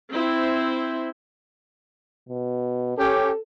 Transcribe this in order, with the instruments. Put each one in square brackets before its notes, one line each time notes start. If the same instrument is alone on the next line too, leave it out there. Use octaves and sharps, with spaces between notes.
[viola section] C4 E4 C5
[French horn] B2
[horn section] C#4 G4 [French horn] A4